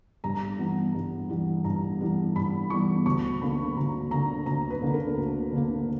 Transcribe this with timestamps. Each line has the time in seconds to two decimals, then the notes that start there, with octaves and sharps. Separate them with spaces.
0.24 G2 A#5
0.58 E3 G3 B3
0.95 G2
1.30 E3 G3 B3
1.64 G2 A#5
2.00 E3 G3 B3
2.36 G2 B5
2.70 E3 G3 B3 C#6
3.06 D2 C#6
3.42 D3 A#3 B5
3.76 D2 A#5
4.11 D3 A#3 A#5
4.46 D2 A#5
4.70 B4
4.82 D3 A#3
4.94 A#4
5.17 D2
5.52 D3 A#3